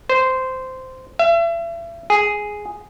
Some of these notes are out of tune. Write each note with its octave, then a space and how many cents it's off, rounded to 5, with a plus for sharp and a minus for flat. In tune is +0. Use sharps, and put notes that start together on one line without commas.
C5 -10
E5 +40
G#4 +0